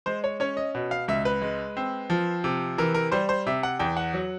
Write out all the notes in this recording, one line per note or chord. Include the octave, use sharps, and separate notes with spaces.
G#3 C5
C#5
C#4 C#5
D#5
B2
F5
C#2 E5
B4
G#3
C4
F3
C3
E3 A#4
A#4
G3 C5
C5
C3 E5
F#5
E2 G5
F#5
F#3